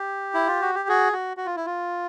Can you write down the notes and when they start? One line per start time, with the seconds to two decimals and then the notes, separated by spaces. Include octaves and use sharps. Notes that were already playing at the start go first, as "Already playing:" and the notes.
Already playing: G4
0.34 E4
0.47 F4
0.62 F#4
0.75 G4
0.89 F#4 G#4
1.13 F#4
1.37 F#4
1.46 F4
1.56 E4
1.66 F4